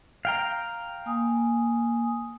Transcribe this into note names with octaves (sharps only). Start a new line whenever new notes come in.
F5 G5 A#5
A#3 G#5 D#6